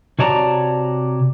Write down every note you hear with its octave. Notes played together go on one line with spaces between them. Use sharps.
C3 F#4 C#5 D5 A5 A#5